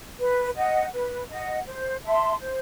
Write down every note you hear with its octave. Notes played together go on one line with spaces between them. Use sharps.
B4
D#5 F#5
B4
D#5 F#5
C5
E5 A5 C6
C5